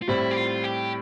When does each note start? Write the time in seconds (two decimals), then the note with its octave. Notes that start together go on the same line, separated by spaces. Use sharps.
0.02 F4
0.08 A2 G3 C4 E4
0.31 G4
0.37 F4
0.64 G4